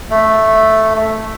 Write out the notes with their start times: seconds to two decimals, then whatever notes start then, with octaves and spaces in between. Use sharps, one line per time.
0.10 A3